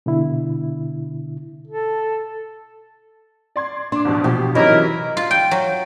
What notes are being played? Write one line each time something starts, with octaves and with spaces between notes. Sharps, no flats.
B2 D3 E4
A4
D5 C6 G#6
D4 C6 D6
C2 F2 B2
B2 F3 G4
C3 E3 F#3 C#4 D#4 E4 A#4
F4
G5
F#3